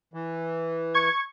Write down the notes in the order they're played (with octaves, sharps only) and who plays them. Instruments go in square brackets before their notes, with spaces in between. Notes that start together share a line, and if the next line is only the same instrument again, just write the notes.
[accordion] E3
[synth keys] C#6 G#6